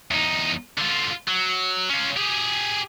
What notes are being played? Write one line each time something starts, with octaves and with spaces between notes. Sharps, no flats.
E2 D#4
D3 F4
F#3
C#4 F4
G4 G#4